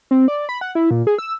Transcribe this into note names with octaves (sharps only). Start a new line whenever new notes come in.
C4
D5
B5
F#5
E4
A#2
G#4
E6